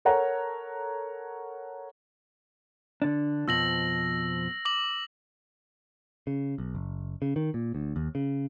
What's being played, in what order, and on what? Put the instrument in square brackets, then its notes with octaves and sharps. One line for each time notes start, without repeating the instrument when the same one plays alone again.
[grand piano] A4 A#4 C#5 F#5 A#5
[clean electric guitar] D3 D4
[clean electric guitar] F2 B2 F3 [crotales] E6 A#6 F#7
[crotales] D6 F#7
[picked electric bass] C#3
B1
F#1
C#3
D#3
A#2
D2
D#2
C#3